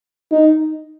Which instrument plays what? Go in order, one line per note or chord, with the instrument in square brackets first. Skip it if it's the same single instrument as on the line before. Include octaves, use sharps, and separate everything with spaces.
[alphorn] D#4